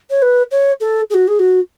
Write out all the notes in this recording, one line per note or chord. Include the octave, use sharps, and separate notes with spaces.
C#5
B4
C#5
A4
G#4
F#4
G#4
F#4